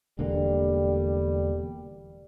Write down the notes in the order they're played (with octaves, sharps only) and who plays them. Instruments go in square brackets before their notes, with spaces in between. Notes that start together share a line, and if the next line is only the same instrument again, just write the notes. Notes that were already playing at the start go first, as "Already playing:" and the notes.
[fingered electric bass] E1 D3 A#3 [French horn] G3